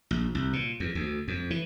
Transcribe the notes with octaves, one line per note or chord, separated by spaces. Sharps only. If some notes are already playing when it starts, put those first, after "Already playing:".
A#1
C2
A#2
E2
D2
F2
E3